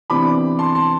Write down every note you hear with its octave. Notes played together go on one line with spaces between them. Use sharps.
C3 E3 B3 D4 B5 D6
A5 C6
A5 C6